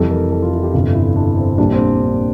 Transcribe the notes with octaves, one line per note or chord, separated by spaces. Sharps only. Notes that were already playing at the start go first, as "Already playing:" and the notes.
Already playing: F1 F2 E3 G3 A4
A#4
A4
F4
E4
G4
G1 F2 C3 F4
E4
D4
C4
A#1 A#2 G3 D4
C4